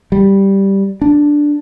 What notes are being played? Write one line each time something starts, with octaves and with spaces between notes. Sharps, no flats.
G3
D4